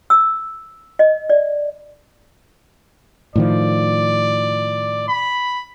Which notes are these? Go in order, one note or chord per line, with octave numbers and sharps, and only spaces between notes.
E6
D#5
D5
A2 D#3 F3 D5
B5